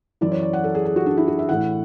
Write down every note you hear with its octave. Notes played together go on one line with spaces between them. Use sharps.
F#2 E3 D5
C#5
D5
F#5
A4
G#4
G#4
F#4
D4
E4
F#4
E5
A2 E3 F#5